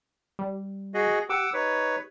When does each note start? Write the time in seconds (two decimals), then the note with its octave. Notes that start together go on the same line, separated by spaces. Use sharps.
0.39 G3
0.94 F#4 G#4 D#5
1.29 G4 F#5 D6 E6
1.54 D#4 B4 C#5